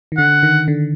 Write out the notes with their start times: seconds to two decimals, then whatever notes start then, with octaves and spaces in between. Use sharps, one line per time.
0.12 D#3
0.17 D3 F#5
0.43 D#3
0.68 D3